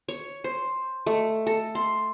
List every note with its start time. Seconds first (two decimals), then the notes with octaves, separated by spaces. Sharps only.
0.09 C#5
0.44 C5
1.06 A3
1.47 A4
1.75 C6